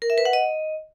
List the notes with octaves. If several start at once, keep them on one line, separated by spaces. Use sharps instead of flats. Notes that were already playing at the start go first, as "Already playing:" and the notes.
A#4
E5
B4
F#5
D#5